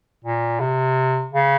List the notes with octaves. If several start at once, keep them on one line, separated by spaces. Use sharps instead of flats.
A#2
C3
C#3